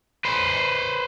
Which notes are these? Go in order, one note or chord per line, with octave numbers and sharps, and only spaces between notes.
B4 C5